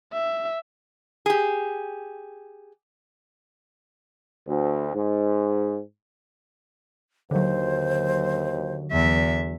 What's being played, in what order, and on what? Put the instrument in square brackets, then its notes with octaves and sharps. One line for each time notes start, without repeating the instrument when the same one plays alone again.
[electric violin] E5
[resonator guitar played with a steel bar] G4 G#4
[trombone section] D2
G#2
[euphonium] D#2 [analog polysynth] D3 F#3 [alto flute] C5
[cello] E2 E5